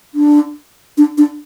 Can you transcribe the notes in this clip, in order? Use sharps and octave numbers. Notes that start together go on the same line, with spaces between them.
D4
D4
D4